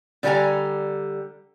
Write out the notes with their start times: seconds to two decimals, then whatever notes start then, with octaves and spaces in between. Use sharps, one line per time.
0.23 D3 G3 A4 A#4 G#5 A#5